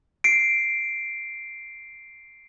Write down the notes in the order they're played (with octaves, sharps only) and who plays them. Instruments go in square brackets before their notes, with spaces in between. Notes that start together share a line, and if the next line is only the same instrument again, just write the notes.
[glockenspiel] C7 D7